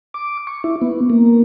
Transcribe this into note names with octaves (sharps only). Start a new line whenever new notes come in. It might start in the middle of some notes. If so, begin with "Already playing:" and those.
D6
C#6
E4
B3
A#3